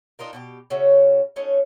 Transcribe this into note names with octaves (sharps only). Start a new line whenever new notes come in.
D4 D#4 F4 A#4
B2 F#4 G4
C#3 C#4 F#4 E5
F#3 A3 C#4 D#4